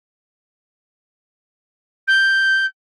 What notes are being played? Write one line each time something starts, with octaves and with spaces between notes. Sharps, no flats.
G6